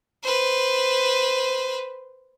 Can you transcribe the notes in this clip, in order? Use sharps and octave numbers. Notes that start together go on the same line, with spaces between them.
B4 C5